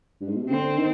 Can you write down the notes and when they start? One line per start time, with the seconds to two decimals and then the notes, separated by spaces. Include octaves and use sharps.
0.21 G2
0.28 G#2
0.35 B2
0.43 C3
0.50 D3 C4
0.78 D#3